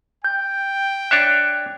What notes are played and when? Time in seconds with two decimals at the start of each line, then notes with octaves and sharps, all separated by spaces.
0.24 G5 G6
1.11 D4 C#5 E5 F#6